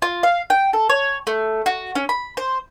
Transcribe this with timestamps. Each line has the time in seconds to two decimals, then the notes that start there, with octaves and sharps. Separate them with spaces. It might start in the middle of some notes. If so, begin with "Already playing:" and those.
0.02 F4
0.23 F5
0.50 G5
0.73 A4
0.89 C#5
1.27 A3
1.66 F#4
1.95 C#4
2.09 B5
2.37 C5